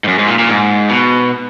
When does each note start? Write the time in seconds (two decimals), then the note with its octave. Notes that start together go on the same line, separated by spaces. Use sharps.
0.04 G#2
0.08 F#2
0.19 G#2
0.28 A#2
0.39 A#2
0.49 G#2
0.89 B2